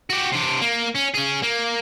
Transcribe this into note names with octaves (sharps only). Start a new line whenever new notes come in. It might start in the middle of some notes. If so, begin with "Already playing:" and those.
F#4 G4
C3 D4
A#3
C#4
C#4 G#4
A#3